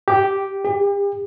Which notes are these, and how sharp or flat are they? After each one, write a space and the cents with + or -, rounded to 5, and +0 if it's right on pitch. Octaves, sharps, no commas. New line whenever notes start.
G4 -5
G4 +40